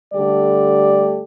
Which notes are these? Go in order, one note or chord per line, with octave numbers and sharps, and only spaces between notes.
D3 G3 A3 G4 A4 D5